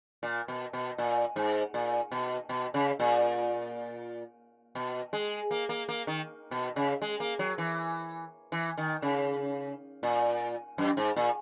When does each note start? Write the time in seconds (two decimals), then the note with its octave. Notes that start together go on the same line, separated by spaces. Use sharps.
0.23 A#2
0.48 B2
0.73 B2
0.98 A#2
1.36 G#2
1.74 A#2
2.11 B2
2.49 B2
2.74 C#3
2.99 A#2
4.75 B2
5.13 G#3
5.51 A#3
5.69 A#3
5.89 A#3
6.07 D#3
6.51 B2
6.76 C#3
7.02 G#3
7.20 A#3
7.39 F#3
7.58 E3
8.52 E3
8.78 D#3
9.02 C#3
10.03 A#2
10.78 F#2
10.97 G#2
11.16 A#2